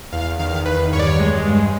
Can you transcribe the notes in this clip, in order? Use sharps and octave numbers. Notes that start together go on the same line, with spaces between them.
E2 F5
D#3 F5
E2 B4
G2 C#5
D5
C#5
G#3
G2